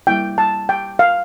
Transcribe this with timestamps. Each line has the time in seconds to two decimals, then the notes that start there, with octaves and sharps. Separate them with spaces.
0.07 G3 A#3 E4 G5
0.38 A5
0.69 G5
0.99 F5